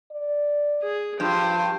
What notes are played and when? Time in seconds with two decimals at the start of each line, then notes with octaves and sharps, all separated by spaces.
0.11 D5
0.82 G#4
1.20 G2 F3 G5 C6